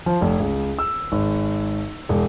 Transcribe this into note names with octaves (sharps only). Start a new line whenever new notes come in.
F3
F1
C#2
E6
G#1
E1